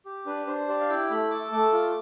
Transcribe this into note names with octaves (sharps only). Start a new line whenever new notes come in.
G4
D4 B4
D4 C5
G4 D5
F5
E4 G5
A3 B5
A4 D6
A3 D6
F4